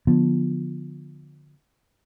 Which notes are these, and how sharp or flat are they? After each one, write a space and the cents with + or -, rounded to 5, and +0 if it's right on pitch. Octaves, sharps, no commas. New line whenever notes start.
D3 +0 F3 +15 B3 -20